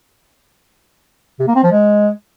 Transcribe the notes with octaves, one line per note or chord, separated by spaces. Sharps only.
C3
A#3
C4
F3
G#3